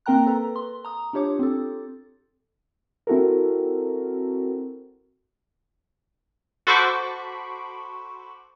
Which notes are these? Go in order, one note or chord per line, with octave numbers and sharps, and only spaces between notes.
A#3 C4 A#4 G5 A#5 F#6
A4 B4 A#5
C6
A#5 D#6
D4 F4 G4 C#5 D6
C4 A4
C4 E4 F#4 A4 A#4
F#4 A4 C5 B5 C#6 D6